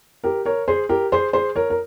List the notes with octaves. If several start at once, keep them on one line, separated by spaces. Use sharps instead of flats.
G4 A#4
A#4 C#5
G#4 C5
G4 A#4
G#4 C5
G#4 C5
A#4 C#5
A#4